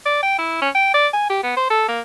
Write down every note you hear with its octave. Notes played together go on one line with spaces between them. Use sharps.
D5
G5
E4
C#4
G5
D5
G#5
G4
B3
C5
A4
A#3